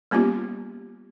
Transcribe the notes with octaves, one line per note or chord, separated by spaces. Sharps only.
G3 A#3 B3 C#4 F4 G4